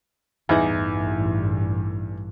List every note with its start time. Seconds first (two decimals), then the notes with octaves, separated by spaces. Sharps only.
0.49 A1 E2 G2 E3 D#4 F#5